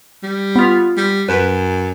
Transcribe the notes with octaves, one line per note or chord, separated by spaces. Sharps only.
G3
B3 F4
G3
F#2 B4